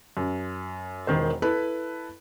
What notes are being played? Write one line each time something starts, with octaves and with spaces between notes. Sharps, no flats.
F#2
E1 D#3 C5
E4 A4 B4 B5